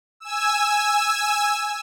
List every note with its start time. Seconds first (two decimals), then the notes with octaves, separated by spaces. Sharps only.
0.20 G#5 E6